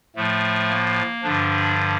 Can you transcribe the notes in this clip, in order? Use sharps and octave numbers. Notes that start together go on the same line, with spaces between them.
A2 F3 A3
A#3
G2 D3 F3 D4